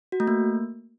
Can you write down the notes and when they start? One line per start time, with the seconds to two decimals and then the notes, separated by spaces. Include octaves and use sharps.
0.12 F#4
0.20 A3
0.27 A#3